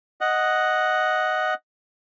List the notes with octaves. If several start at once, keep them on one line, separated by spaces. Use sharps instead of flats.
D#5 F#5